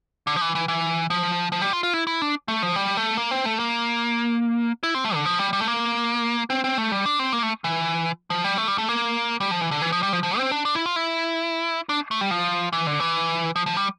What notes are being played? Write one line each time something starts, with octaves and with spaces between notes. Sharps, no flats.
D3
F3
E3
E3
E3
F3
F3
G3
F4
F4
E4
E4
D4
A3
F3
G3
A3
A#3
C4
A3
A#3
E4
C4
A3
D3
F3
G3
G3
A3
A#3
C4
C4
A3
G3
D4
C4
A#3
A3
E3
F3
G3
A3
G3
A3
A#3
G3
F3
E3
D3
E3
F3
G3
F3
F3
C4
D4
D4
E4
F4
E4
D4
A3
G3
F3
E3
D3
E3
F3
F3
G3